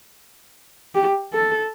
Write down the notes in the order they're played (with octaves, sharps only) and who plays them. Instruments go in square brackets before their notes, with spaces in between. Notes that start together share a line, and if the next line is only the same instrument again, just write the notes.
[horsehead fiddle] G4
A4